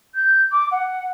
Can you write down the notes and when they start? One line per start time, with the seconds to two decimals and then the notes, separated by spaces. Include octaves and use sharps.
0.14 G6
0.52 D6
0.71 F#5